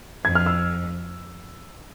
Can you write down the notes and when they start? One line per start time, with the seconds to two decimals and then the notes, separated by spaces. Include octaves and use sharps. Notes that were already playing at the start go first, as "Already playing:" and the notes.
0.25 F2 G#6
0.35 F6
0.46 E6